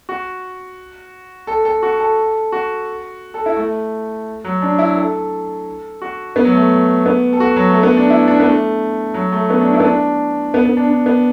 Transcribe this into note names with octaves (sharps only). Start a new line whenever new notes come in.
F#4
A4
A4
F#4
A4
F#4
A4
E4
A3
F#3
D4
E4
A4
F#4
B3
F#3
A3
B3
A4
F#4
F#3
A3
B3
D4
E4
D4
B3
A3
F#3
A3
B3
D4
E4
B3
D4
B3
B3
D4
D4
B3